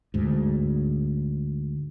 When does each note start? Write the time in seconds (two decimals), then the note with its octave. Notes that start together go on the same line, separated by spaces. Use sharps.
0.14 D2 G#2